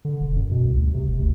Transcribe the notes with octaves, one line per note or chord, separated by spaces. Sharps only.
D3
E1
F#2
B2
C2
D2
C3
F#1
D2